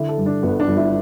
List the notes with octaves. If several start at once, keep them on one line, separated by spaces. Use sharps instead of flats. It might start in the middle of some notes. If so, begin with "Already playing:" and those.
Already playing: D3 E4
A4
G2
D4
G1 B3
D4
G1
E4